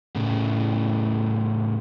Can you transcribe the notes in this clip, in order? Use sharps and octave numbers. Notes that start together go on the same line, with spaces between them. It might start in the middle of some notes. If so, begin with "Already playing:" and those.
A2 C#3